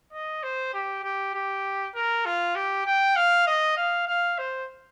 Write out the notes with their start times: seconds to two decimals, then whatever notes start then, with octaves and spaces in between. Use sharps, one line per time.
0.12 D#5
0.43 C5
0.74 G4
1.04 G4
1.34 G4
1.95 A#4
2.26 F4
2.55 G4
2.86 G5
3.16 F5
3.47 D#5
3.77 F5
4.07 F5
4.38 C5